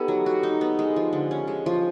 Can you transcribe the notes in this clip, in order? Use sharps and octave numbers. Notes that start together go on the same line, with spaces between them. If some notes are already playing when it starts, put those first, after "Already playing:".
Already playing: B3 D#4 G4 A4
F#3
F#4
D#4
B3
G#3
F3
D3
C#4
G#3
F3